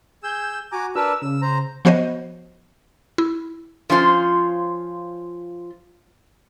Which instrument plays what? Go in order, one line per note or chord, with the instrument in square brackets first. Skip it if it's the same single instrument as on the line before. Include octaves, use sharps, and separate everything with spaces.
[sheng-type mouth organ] G#4 E6 [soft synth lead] G6
[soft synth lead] F#4 [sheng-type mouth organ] G#5 A#5 D6
[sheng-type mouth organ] D4 A#4 B4 [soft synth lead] E6
[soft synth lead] C#3 [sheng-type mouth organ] E6
[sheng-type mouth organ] C5 A#5
[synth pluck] F3 B3 F#4 C5 C#5 D#5
E4
[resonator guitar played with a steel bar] F3 C#4 F4 C5